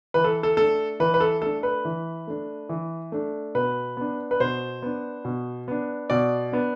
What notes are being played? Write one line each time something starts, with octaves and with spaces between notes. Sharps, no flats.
E3 B4
A4
A4
A3 D4 A4
E3 B4
B4
A4
A3 D4 A4
B4
E3
A3 D4
E3
A3 D4
B2 B4
B3 D4
B4
B2 C5
B3 D4
B2
B3 D4
B2 D5
B3 D4